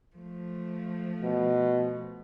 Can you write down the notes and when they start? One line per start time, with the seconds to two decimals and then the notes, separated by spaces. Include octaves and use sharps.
0.16 F3 A3
1.23 B2